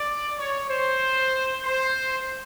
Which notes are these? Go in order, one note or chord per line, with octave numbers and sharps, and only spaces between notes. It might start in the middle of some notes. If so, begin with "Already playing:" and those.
Already playing: D5
C#5
C5
C5